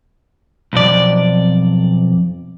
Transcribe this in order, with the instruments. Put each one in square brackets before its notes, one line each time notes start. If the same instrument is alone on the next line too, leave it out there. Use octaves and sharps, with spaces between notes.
[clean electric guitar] B1 F2 D5